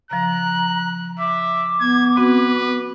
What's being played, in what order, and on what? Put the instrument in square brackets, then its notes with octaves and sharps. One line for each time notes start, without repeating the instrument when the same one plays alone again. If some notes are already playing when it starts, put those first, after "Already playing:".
[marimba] C#3 F3 [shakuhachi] A#5 [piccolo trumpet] F#6
[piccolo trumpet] E5 [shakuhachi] D6
[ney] B3 [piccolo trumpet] G#6
[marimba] C4 F#4 [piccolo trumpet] B4